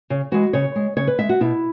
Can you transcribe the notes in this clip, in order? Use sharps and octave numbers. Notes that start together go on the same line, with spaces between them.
C#3
E3 G#3 F#4
C#3 C#5
G#3
C#3 C#5
B4
G#3 E5
F#4
B2 E4